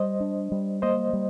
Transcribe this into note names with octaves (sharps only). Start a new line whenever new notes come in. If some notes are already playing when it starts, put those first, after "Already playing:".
Already playing: G3 C5 D#5
D4
G3
A#3 C5 D#5
G3